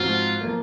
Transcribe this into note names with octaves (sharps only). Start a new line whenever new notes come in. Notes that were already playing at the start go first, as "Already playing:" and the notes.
Already playing: G#2 F3 C4 F4 F#4
F3 A#3